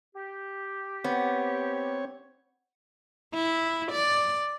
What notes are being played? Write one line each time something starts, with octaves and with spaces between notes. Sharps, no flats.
G4
B3 C4 C#5
E4
D5